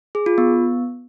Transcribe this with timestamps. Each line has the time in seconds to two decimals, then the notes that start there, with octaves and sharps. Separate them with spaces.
0.15 G#4
0.26 F4
0.38 B3